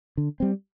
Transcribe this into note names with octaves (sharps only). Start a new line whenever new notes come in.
D3
G3 C4